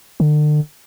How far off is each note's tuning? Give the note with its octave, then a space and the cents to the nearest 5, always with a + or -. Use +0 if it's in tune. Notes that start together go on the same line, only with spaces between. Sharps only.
D3 +35